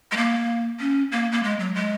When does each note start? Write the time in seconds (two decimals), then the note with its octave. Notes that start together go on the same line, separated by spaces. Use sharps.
0.12 G#3
0.17 A#3
0.80 C#4
1.12 A#3
1.32 A#3
1.43 G#3
1.59 F#3
1.75 G#3